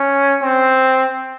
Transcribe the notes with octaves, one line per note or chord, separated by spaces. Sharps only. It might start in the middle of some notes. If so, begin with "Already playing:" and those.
Already playing: C#4
C4